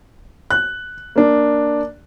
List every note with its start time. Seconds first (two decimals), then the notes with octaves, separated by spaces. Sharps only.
0.51 F#6
1.16 A#3 D4